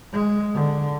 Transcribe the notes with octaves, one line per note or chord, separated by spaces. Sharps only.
G#3
D3